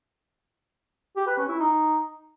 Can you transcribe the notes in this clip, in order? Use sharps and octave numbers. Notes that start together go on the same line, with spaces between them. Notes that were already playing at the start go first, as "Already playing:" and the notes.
G4
B4
C#4
E4
D#4